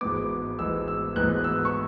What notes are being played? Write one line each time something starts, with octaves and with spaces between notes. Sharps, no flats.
G#1 G#2 E3 G#3 B3 D6
G#1 G#2 E3 G#3 B3 E6
E6
G#1 G#2 E3 G#3 B3 F#6
E6
C#6